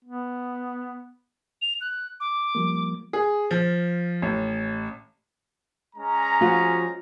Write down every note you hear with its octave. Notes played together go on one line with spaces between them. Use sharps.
B3
F7
F#6
D6
F3 G3 A#3
G#4
F3
A1
G#3 C#4 A#5
F3 F4 F#4